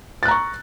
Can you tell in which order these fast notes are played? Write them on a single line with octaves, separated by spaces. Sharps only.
A6 F#6 A#5 C#6